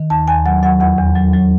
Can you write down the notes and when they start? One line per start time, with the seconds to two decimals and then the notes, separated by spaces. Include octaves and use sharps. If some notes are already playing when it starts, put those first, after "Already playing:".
Already playing: D#3
0.10 D#2 A5
0.28 D#2 G#5
0.46 F#3 F#5
0.63 F#3 F#5
0.80 E2 F#5
0.98 E2
1.16 F#3
1.33 F#3